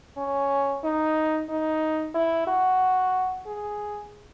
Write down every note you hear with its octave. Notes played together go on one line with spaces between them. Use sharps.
C#4
D#4
D#4
E4
F#4
G#4